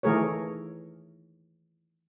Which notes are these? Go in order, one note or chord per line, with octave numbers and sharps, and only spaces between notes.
D#3 E3 A3 G#4 A#4 C#5